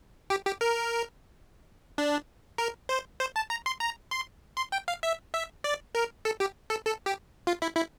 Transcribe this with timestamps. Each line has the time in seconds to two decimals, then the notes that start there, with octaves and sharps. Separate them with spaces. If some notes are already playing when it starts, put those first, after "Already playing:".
0.30 G4
0.46 G4
0.61 A#4
1.98 D4
2.58 A#4
2.89 C5
3.20 C5
3.36 A5
3.50 A#5
3.66 C6
3.80 A#5
4.11 C6
4.57 C6
4.72 G5
4.88 F5
5.03 E5
5.34 E5
5.64 D5
5.95 A#4
6.25 A4
6.40 G4
6.70 A4
6.86 A4
7.06 G4
7.47 F4
7.62 E4
7.76 E4